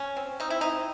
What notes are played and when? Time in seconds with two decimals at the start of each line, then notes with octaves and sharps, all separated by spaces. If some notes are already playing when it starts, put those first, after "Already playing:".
Already playing: C#4
0.17 C4
0.40 C4 D#4
0.50 E4
0.61 C4 D#4